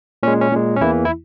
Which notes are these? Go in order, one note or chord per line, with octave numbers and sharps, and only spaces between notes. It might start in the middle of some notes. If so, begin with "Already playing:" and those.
A#2 G#3 C#4
C#4
A#2 G#3
C#4
E2 E3 A#3 E4
E4